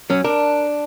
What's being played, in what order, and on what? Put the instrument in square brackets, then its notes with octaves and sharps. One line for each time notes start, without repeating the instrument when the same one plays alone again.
[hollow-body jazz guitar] F#3 C#4
[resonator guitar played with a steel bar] D4 [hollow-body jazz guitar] A#4